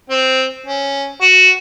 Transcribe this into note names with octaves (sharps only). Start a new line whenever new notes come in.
C4
C#4
F#4